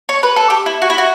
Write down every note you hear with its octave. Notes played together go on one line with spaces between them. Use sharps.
C#5
B4
A4
G4
E4
F#4
E4
F#4